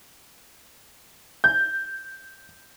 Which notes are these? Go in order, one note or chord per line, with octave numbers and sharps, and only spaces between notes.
G6